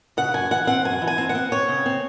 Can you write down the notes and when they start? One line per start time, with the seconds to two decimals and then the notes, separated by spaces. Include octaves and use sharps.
0.17 C#3 F#5
0.34 F#2 G#5
0.51 E3 F#5
0.67 C4 F#5
0.84 F#2 G#5
1.02 E3
1.07 G#5
1.18 C4
1.29 F#5
1.35 C4
1.52 C4 C#5
1.69 C#3
1.86 C4